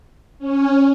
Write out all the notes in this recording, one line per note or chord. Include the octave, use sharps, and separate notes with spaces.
C#4